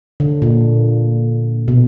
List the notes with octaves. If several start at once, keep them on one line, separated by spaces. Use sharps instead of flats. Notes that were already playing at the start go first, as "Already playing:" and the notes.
D3
A#2
B2